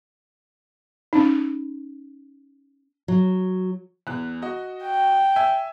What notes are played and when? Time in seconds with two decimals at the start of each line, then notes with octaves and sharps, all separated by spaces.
1.13 C#4 D#4
3.08 F#3
4.07 E2 F#6
4.42 F#4 D#5
4.84 G5
5.36 E5 G#5 E6